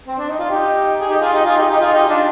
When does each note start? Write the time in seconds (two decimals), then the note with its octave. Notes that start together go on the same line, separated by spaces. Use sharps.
0.07 C4
0.18 D4
0.29 D#4
0.39 F4
0.50 D#4 G4
1.01 G#4
1.09 D#4 G4
1.21 F4 G#4
1.33 D#4 G4
1.45 F4 G#4
1.57 D#4 G4
1.69 D#4 G4
1.81 F4 G#4
1.93 D#4 G4
2.09 D4 F4